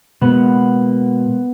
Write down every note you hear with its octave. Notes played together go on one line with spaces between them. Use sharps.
B2 G#3 A#3 B3 F#5